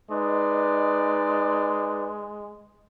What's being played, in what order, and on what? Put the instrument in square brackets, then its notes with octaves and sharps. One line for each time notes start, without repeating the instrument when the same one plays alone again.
[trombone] G#3 [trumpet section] D#4 B4 D5